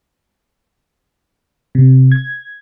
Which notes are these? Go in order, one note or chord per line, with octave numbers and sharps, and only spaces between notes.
C3
G#6